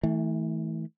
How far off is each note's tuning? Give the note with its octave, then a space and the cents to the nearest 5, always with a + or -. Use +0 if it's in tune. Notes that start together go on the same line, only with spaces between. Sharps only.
E3 -25 A3 +5